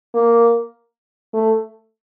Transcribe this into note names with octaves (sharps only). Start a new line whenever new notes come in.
A#3
A3